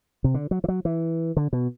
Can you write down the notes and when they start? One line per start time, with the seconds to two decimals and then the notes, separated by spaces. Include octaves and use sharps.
0.24 C3
0.34 D3
0.51 F#3
0.64 E3
0.68 F#3
0.85 E3
1.37 D3
1.53 B2